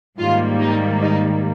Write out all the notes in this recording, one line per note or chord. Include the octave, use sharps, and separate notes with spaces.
G#2 D#3 G3 A#3 F4
D#4
D#4